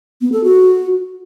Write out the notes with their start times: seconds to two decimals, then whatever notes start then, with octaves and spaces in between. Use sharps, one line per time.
0.21 B3
0.32 A4
0.44 F#4